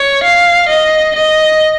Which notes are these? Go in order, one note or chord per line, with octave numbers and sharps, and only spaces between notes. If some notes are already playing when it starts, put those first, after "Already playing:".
Already playing: C#5
F5
D#5
D#5